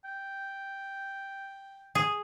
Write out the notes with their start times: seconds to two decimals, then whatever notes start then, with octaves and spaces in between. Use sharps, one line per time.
0.05 G5
1.95 G#4